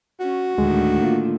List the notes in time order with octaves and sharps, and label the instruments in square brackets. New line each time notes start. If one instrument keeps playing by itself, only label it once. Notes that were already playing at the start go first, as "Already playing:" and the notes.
[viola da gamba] C#4 [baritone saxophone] F#4
[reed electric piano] D2 G#3 [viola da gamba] A2 D3 D#3
[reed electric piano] A#3 F4